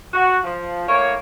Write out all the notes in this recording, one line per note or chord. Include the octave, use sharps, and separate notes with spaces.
F#4
F3
A2 A#3 C#5